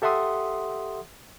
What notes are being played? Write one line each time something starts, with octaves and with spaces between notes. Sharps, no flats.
G4 A4 E5 F#5 C6 D#6